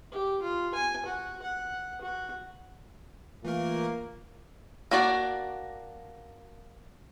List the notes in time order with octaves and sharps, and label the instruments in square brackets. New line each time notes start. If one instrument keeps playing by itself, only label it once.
[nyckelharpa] G4
F4
G#5
F#4
F#5
F#4
[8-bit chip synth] E3 A3 A#4 [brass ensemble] A#3 [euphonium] F4
[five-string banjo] A#3 D4 F#4 D5